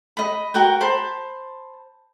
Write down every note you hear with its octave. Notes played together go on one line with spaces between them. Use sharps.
D#5 B5
F#4 A#4 F#5 G5
C5 A5 B5